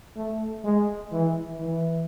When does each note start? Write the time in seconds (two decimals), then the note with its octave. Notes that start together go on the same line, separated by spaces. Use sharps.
0.16 A3
0.64 G#3
1.12 E3
1.60 E3